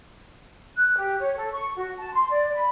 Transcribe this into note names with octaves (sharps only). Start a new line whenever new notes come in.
F#6
G4
C#5
A4
C#6
F#4
A5
C6
D5
B5